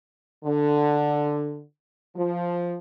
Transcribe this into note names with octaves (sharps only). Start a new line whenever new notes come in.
D3
F3